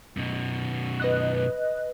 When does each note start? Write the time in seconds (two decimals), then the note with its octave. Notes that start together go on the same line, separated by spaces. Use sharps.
0.17 F#2 B2
1.00 B4 D#5 F#6